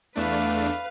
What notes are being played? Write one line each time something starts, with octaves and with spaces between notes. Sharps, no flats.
E2 A3 D4 B4 F5